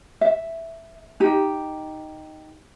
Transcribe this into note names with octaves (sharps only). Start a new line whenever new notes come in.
E5
D#4 G4